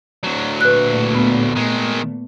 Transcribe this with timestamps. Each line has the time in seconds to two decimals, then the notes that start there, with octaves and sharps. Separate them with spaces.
0.24 D2 F#3
0.61 A#2 A3 B4 F#6
1.15 B3
1.56 D#3 G#3